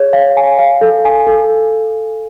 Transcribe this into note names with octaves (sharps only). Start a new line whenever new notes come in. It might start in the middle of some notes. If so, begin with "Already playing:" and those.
Already playing: G#4 C#5
F5
G#5
F5
A4
G#5
A4